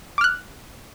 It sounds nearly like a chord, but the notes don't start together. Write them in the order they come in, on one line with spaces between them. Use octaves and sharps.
D6 F6 F#6